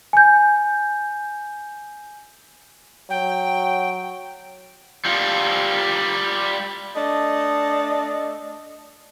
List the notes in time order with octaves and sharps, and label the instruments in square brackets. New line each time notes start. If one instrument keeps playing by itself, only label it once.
[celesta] G#5 G6
[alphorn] F#3 [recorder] G5
[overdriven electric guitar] G3 F4
[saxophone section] A3 D4 D#5